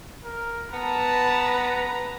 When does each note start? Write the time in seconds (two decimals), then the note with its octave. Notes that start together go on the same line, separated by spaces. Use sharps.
0.24 A#4
0.74 B3 B4 A5 A#5